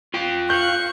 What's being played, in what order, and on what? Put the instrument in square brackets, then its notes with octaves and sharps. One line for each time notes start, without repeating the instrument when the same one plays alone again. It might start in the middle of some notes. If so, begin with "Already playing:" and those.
[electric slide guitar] F4 G5
[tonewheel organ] F5 F#6 [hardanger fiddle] C#6 [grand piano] G6